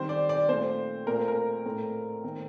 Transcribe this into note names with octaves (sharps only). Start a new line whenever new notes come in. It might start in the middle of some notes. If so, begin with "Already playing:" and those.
Already playing: D#3 G3 C4 C5
D5
D5
A#2 A3 C4 C5
A#2 A3 C4 A#4
A#4
A2 A3 C4
D#3 A3 C4